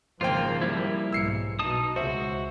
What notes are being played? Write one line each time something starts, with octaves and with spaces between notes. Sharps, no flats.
G#1 C#3 F3 A#3 F4 C5 G5
G3 A#3 E4
B1 G#2 E6 C7 C#7
B2 D#4 A5 D#6
C#2 F#4 C5 E5